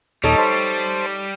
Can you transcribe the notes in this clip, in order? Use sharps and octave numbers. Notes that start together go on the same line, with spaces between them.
D#2 A#2 G3 D#4 A4 C#5
C5 A5 C6